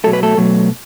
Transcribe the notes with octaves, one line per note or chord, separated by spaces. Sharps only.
B2 F#3 A3 A4
B4
A3 A4
B2 F#3 A3